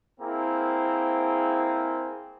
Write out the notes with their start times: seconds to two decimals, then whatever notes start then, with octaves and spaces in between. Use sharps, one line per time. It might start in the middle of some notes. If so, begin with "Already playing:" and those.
0.20 A#3 C4 E4 G#4